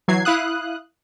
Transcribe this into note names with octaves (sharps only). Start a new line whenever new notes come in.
E3 F#3 G#6 C7
E4 F5 D#6 F#6